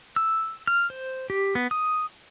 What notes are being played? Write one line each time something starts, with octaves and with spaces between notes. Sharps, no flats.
E6
F6
C5
G4
B3
D#6